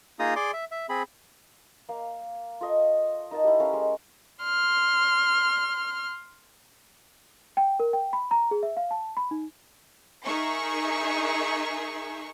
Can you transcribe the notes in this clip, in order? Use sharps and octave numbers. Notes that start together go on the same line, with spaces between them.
A#3 D#4 F4 G#4 A#5 D#6
G#4 D5 C6 D6
E5
E5
C4 G#4 B5
A#3 F5
F4 A4 D#5 C#6
D#4 A#4 A5
E4 G4
C#4 A4 A#4 F5
G#3
C6 F6
G5
A#4
G5
B5
A#5
G#4
E5
F5
A5
B5
D#4
D#4 G#4 A#4 E5 C#6